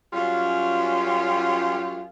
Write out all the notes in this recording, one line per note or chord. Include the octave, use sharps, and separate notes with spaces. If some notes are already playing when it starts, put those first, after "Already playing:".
F#2 G3 C#4 F4